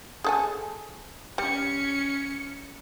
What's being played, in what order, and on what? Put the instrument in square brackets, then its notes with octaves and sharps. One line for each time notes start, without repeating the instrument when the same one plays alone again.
[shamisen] G#4 A4 G#5
[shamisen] G3 [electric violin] C#4 C#7